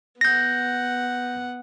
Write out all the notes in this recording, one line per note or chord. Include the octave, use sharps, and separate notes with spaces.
B3 F#5 G6 A#6